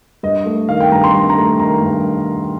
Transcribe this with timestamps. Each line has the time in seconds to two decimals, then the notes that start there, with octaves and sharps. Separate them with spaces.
0.23 G2 D#5
0.46 A3
0.69 D#3 F5
0.80 G5
0.92 G2 A#5
1.04 C6
1.14 G2 C6
1.29 A#5
1.38 A3
1.60 D#3 A#5
1.83 G2